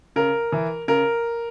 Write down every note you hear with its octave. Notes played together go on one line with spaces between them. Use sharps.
C#3 A#4
E3
C#3 A#4